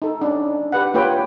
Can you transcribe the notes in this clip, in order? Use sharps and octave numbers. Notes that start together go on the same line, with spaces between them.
D#4 A4
C#4 D4
G4 B4 F#5
A#3 F4 G4 B4 C#5 G5